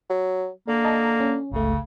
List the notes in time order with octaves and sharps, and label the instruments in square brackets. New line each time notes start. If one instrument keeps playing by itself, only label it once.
[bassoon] F#3
[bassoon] D3 [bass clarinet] A#3
[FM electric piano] D#5 A5 A#5
C#4
[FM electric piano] G1 C#2 A3 [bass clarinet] C#3